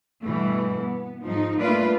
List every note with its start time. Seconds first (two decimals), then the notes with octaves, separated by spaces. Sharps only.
0.23 G2 B2 E3 A3
0.79 B3
1.23 G#2 F3 D#4
1.59 A3 A#3 D4 F4 B4 D5